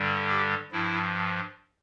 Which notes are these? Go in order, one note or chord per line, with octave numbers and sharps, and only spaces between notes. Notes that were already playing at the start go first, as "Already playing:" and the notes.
Already playing: G2 D3 G3
G4
G2 F3 E4